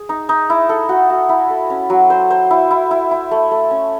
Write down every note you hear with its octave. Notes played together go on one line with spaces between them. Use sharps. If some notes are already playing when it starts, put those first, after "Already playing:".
Already playing: G#4
D#4
D#4
E4
A4
F#4
F#4
E4
A4
C#4
F#3
C5
C5
E4
E4
E4
E4
A3
A3
C#4